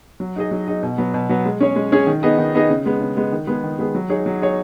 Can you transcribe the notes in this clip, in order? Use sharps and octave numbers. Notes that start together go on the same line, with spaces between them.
F#3
D#4 G#4 D#5
F#3
D#4 G#4 D#5
B2
F#3 B3
B2
F#3 B3
G#3
C#4 G#4 C#5
G#3
C#4 G#4 C#5
D#3
B3 D#4 G#4 D#5
D#3
B3 D#4 G#4 D#5
C#3
G#3 B3
C#3
G#3 B3
D#3
G#3 B3 G#4
D#3
G#3 B3 G#4
F#3
D#4 G#4 C#5
F#3
D#4 G#4 C#5